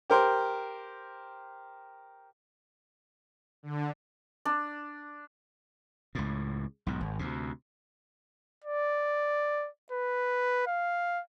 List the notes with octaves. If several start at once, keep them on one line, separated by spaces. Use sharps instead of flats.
G4 A#4 C5
D3
D4
C#2 A2
B1 G#2
G#1
D2 C3
D5
B4
F5